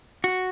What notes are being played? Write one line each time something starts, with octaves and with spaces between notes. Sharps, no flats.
F#4